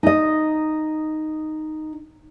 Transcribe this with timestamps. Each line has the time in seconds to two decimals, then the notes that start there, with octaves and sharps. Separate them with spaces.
0.03 D#4 D#5